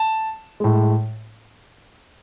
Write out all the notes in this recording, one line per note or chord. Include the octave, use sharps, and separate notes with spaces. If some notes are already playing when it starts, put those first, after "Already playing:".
Already playing: A5
A2 G#3